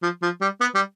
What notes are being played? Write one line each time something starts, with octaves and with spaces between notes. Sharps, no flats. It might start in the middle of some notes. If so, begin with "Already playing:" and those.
F3
F3
G3
B3
G3